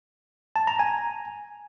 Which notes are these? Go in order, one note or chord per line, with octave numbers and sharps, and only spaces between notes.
A5
A#5
G#5